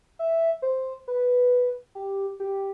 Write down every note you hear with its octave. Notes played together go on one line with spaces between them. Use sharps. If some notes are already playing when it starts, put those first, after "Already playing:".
E5
C5
B4
G4
G4